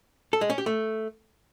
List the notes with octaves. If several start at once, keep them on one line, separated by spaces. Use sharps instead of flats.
A4
G#3
C#4
G4
A3